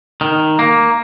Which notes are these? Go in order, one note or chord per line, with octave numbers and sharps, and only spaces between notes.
D#3
A#3